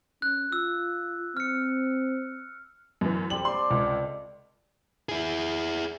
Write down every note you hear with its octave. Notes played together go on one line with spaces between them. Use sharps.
C#4 F#6
F4 E6
C4 F6 C#7
F#2 E3
G3 C4 A4 F#7
C5 D5 C6
C#2
E4 G#4